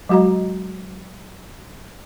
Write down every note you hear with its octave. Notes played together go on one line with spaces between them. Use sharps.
F#3 G#3 F#4 D#5 A#5